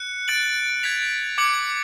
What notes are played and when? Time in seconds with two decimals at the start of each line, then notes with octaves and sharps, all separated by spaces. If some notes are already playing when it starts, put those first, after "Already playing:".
Already playing: F#6 C#7
0.28 F#6 A6 D7 F#7
0.83 G#6 B6 F7
1.38 D6 G#6 C#7 F#7